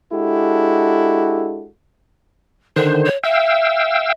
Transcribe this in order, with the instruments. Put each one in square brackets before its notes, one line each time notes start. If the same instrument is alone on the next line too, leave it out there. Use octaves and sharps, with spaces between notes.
[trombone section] G#3 D4 E4 F#4 G4 A4
[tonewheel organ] D3 D#3 C5 [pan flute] D4
[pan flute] C#5
[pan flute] E5 [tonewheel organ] F5 G5 E6